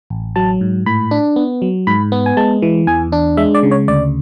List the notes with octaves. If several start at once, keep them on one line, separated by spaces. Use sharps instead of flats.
A1
F#3 A5
G#2
A2 B5
D4
B3
F#3
G#2 B5
B3
G#5
G#3 A5
E3
E2 G#5
D4
G#3 E5
D5
C#3
C#5
D2 D5